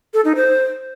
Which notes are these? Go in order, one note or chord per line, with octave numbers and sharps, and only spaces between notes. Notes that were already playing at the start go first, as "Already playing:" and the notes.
A4
D#4
C5